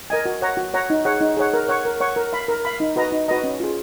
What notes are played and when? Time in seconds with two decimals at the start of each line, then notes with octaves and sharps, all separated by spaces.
0.10 A#4 D#5 G#5
0.25 F#4
0.42 C#5 F#5 A#5
0.57 F#4
0.74 C#5 F#5 A#5
0.90 D#4
1.05 G#4 C#5 F#5
1.21 D#4
1.37 G#4 C#5 F#5
1.54 A#4
1.69 C#5 F#5 C#6
1.85 A#4
2.00 C#5 F#5 C#6
2.16 A#4
2.33 F5 B5
2.48 A#4
2.65 F5 B5
2.80 D#4
2.96 F#4 B4 D#5 A#5
3.12 D#4
3.28 F#4 B4 D#5 A#5
3.44 C#4
3.60 F4 G#4